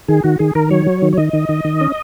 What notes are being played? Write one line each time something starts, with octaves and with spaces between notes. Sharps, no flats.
D#3 G#4
D#3 F#4
D#3 G#4
D#3 A#4
F#3 C#5
F#3
D#3
C#5
D#3 D#5
D#3
D#3
D#3
C#4